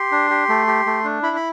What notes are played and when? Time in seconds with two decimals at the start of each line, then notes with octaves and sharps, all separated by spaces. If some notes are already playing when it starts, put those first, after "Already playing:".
Already playing: G4 C6
0.12 D4
0.31 G4
0.49 A3
0.67 G4
0.86 A3
1.04 D4
1.23 E4 B5
1.36 B5